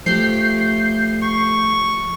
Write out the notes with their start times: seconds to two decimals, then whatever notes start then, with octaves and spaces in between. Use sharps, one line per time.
0.06 F3 A3 G4 G6 C7
1.23 C#6